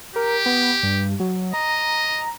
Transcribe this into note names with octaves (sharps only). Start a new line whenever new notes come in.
G4 A#4
B3
G2
F#3
D#5 A#5